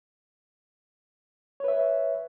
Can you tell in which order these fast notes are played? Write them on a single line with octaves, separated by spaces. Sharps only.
C#5 B4 E5